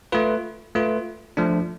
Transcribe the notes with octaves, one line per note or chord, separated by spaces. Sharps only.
A3 F4 B4
A3 F4 B4
F3 A3 D4